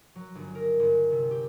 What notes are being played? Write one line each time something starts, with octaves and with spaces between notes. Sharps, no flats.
F#3
G1
A#4
G1
C3
G4